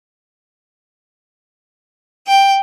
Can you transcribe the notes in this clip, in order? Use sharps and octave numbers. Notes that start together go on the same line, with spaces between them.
G5